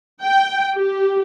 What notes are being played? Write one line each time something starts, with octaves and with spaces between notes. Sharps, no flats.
G5
G4